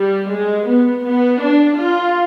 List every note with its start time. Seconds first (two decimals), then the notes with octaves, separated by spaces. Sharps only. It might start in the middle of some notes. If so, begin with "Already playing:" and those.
Already playing: G3
0.31 G#3
0.68 B3
1.05 B3
1.42 D4
1.79 F4